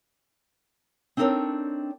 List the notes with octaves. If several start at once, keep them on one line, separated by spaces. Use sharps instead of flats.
C4 D4 D#4 A4 A#4 C#5